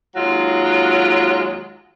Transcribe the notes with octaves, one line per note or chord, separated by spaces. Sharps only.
D#2 F#3 G#3 F4